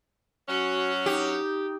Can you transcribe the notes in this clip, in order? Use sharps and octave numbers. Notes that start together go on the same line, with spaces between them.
F#3 C#4 F#4
D#4 G4